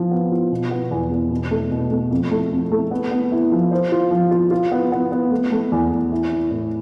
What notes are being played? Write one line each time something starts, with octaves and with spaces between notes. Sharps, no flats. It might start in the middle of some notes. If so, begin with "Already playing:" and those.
Already playing: F3 F4
B3
F4
B2
B3
E2
E2
B2
A3
B2
A3
F2
A3
F2
A3
B3
B3
E4
F3
C5
F4
F3
F4
F4
B3
B3
B3
A3
A3
E2
E2
E4
E4
A2